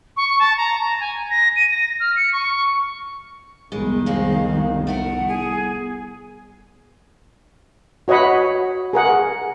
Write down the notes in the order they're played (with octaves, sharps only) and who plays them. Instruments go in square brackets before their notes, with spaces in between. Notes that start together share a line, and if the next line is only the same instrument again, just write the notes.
[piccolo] C#6
A5
A#5
A#5
G#5
A#6
D#7
A#6
F6
C#7
C#6
[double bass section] F1 C2 D#3 [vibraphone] G3 B3 [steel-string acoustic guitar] G#3
[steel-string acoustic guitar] G#3 A#3 C4 [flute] F5
[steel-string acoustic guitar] A3 E4 A#4 [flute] F#5
[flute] G#4
[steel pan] F#4 C#5 D#5 F#5 B5
G#4 A#4 F#5